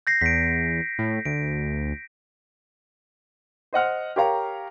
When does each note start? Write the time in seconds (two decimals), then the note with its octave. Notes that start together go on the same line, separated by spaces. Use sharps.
0.07 G6 A#6 C7
0.21 E2 B6 D7
0.99 A2
1.25 D2 D7
3.73 C5 D#5 F#5 F6
4.16 G4 A#4 C#5 F5 A#5